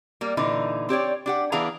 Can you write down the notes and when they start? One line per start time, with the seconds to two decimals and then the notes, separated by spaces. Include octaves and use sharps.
0.21 G3 A#3
0.37 A#2 D3 E3 D#4
0.89 C4 G4 C#5 D5
1.26 D4 G4 F#5
1.52 E3 B3 D4 G#4 F5 A#5